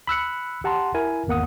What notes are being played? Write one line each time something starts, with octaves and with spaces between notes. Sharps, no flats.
B5 E6 F#6 C#7
G4 F#5 A5 A#5 C6
E4 A#4 G#5
G#1 E2 A#3 F#5 D#6